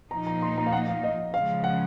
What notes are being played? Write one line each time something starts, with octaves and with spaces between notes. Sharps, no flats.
A#2 F3 A#3 D#4 A#5
A#5
C6
A#5
F5
F#5
F5
D#5
C#3 F3 G#3 F5
F#5